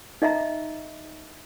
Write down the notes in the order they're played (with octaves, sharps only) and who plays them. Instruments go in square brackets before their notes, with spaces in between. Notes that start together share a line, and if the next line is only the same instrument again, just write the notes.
[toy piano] D#4 D#5 E5 A#5